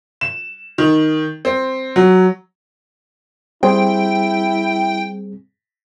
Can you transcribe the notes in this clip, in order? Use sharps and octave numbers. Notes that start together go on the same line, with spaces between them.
E7
D#3
C4
F#3
G3 C4 E4 G#4 G5